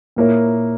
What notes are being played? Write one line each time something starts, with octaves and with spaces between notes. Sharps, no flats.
A#2 A#3 E4 A#4 C#5